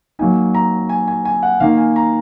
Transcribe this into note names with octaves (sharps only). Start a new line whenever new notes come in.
F#3 A#3 D#4 G#5
A#5
G#5
G#5
G#5
F#5
D#3 A#3 D#4 F5
G#5
A#5